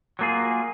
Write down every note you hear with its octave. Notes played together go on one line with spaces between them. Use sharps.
F#3 A#3 F4 G#4